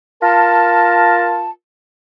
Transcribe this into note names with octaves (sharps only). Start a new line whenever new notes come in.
F4 A#4 A5